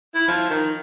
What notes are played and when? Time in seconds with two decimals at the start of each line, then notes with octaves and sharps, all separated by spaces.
0.15 E4
0.28 F3
0.50 D#3